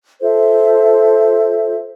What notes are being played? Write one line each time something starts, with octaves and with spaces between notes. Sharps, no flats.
F4 A4 C5 E5